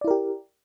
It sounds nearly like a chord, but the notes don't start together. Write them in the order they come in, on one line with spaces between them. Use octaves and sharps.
D5 E4 A#4 G4